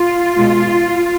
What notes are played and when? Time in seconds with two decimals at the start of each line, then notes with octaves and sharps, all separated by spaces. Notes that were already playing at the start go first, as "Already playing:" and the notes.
Already playing: F4
0.36 B2 G#3